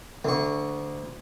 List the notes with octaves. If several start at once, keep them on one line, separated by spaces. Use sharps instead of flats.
D2 C#6